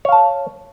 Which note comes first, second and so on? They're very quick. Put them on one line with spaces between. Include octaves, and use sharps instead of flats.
C#5 F5 A5